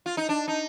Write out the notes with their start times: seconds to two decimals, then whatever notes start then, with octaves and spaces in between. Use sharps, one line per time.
0.06 F4
0.17 D#4
0.29 D4
0.48 D#4